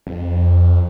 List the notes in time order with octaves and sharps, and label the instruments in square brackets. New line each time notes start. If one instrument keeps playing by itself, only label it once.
[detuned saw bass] F2